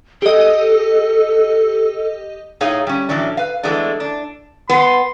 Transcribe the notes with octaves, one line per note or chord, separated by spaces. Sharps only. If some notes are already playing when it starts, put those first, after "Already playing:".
G4 A4 D#5
A2 D#4 G#4 C#5 F5
G3 C#4
A2 E3 F#3 C#4 D4
B4 F5
E3 G#3 A3 B3 D4
D4
B3 C6